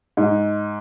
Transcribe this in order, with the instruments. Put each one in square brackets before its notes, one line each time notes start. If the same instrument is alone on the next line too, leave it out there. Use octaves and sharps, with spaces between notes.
[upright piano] G#2